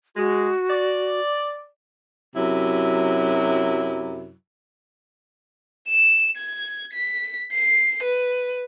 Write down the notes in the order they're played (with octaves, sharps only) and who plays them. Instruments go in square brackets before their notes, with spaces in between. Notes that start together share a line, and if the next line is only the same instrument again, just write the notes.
[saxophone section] G#3 [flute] F#4
[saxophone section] D5
F#2 C3 F#3 E4
[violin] E7
G#6
B6
C7
B4